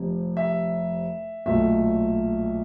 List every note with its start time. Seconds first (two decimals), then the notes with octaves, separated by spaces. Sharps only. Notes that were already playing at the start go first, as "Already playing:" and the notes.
Already playing: F1 F2 C3
0.37 E5
1.46 B1 A#2 F#3 A3 E5